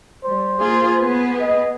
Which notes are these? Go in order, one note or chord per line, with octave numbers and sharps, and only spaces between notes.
G3 C5
A#3 F4 G#4
B3 G#4 B4
D#5